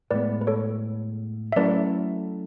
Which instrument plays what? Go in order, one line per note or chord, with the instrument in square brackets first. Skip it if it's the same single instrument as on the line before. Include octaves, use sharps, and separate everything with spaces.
[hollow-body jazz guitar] A2 G#3 B3 [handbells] B4 D5
[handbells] B4
A4 C#5
E5
[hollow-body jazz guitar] F#3 A3 C#4 E4 A4 [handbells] B4 D5